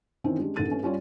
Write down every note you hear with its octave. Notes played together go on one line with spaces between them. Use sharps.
D#3 E3 C4 C#4 E4
G#3 C#4 D4 G4
A1 D#3 A4 A6 D#7
G2 A3 C4 C#4
G3 C#4 F4 C#5 D5